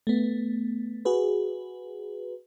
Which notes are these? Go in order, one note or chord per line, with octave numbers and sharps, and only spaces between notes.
A3 B3
F#4 G#4 B4